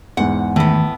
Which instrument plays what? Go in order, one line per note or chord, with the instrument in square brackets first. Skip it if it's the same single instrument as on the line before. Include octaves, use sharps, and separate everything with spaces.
[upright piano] E2 G#2 [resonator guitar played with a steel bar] F#5
[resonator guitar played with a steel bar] A2 B3 [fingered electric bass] D#3 E3 A3